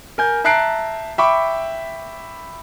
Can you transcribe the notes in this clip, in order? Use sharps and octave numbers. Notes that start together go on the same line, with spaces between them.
A#4 G#5 G6
E5 A5 A#5 F#6 C7 D7
E5 G5 B5 C#6 D6